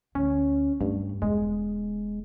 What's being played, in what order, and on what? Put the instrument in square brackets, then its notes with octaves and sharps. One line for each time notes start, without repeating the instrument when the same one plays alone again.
[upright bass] D2 [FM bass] C#4
[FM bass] G2 [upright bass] A3
[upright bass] E1 [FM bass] G#3